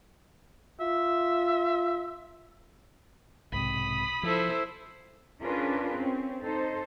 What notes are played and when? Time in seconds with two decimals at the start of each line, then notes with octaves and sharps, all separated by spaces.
0.80 F4 E5
3.52 B1 G#2 C3 B5 D#6
4.23 F3 E4 A4 C5
5.43 C#4 D4 F4 G#4 A#4 B4
5.94 C4 C#4
6.43 D#4 A4 C5